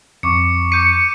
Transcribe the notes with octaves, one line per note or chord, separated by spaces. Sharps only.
F2 C#6 D6 C#7
D6 G6 C#7 D#7